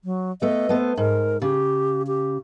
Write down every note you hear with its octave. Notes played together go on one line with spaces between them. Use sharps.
F#3
A3 B3 D#5
A3 B3 C5
G#2 A#4
C#3 G4
G4